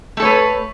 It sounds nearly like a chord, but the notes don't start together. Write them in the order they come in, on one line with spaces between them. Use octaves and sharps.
A3 A4 C#5 B4